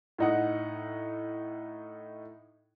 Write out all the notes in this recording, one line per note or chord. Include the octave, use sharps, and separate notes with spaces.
A2 D#4 F#5